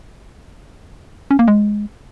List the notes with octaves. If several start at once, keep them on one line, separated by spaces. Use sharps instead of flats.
C#4
A#3
G#3